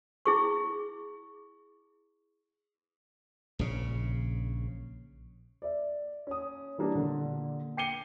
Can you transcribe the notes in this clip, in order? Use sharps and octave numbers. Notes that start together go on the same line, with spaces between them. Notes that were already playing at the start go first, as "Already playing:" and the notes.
E4 G#4 C#6
A#1 C#3
D5 E5
C#4 D#6
E3 G3 A#3 D4
A#2 D3
G5 D6 C7 C#7 D#7 G7